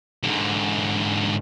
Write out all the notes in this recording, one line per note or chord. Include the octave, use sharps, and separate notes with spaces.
G#2 D3